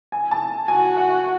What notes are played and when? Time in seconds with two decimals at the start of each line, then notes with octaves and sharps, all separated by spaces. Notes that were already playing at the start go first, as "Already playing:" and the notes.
0.12 G#5
0.31 A5
0.68 F#4 G#5
0.96 F#5